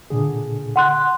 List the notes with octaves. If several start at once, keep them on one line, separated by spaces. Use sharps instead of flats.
A#2 D3 G#4
F#5 C6 F#6